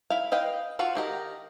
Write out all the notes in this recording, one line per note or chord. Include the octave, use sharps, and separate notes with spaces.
E4 F5
B4 D#5 F5 G5
F4 F#4 F5
D#3 G4 A#4 D#5